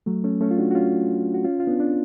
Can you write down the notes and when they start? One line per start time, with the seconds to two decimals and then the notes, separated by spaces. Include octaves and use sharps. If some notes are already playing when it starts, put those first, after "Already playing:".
0.06 F#3 A3
0.24 A3 C#4
0.41 A3 C#4
0.51 F4
0.58 D4 F#4
0.71 F#4
0.75 C#4 F4
1.34 F#4
1.45 C#4 F4
1.60 F4
1.67 B3 D4
1.80 D4